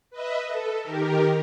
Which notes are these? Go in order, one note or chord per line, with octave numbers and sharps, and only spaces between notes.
B4 D#5 E5
A4
D#3 G4 A#4